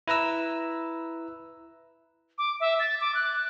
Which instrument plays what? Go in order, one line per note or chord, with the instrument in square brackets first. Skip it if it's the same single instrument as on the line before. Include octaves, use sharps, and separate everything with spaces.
[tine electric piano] E4 B4 A#5 E6
[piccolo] D6
E5
A6
D6
F#6